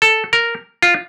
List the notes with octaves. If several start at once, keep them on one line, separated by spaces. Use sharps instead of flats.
A4
A#4
F4